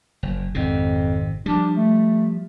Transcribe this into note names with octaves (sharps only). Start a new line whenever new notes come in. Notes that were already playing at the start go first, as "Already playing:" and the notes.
F#1
G#1 F2 C3
F3 G3 D4
A3